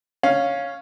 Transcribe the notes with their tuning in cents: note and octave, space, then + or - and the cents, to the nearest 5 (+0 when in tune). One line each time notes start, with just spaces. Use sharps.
C#4 +0 F5 +5